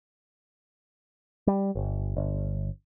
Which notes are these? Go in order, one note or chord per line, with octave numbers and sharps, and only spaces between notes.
G3
G1
G1